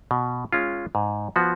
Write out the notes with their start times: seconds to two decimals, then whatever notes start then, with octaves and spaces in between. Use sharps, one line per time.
0.11 B2
0.53 G#3 C#4 F4
0.95 G#2
1.36 F3 B3 F#4